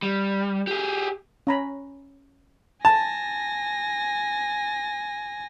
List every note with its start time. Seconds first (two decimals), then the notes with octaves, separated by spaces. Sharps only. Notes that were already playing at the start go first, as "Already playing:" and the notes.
0.02 G3
0.67 G4 G#4
1.47 C#4 A#5 B5
2.85 G#5 A5 A#6